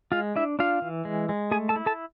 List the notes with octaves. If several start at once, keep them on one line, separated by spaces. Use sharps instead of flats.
G#3 F4 F5
D4 E4 E5
D4 F4 F5
E3
G#3
G#3
A3 G#4 G#5
A4 A5
E4
A4 A5